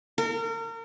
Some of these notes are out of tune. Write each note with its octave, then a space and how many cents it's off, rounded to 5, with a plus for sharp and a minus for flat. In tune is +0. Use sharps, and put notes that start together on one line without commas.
A#4 -35